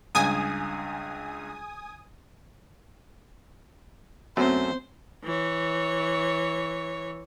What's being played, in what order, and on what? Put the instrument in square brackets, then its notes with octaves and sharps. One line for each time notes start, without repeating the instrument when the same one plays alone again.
[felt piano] C#2 G2 [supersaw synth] G#5 D#6
[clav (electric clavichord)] F#2 F#3 A3 [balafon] B3 C4 [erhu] C5
[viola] E3 C#5